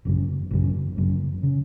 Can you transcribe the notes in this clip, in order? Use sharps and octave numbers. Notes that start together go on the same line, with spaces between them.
G#1 F#2 C#3
G#1 F#2 C#3
G#1 F#2 C#3
C#3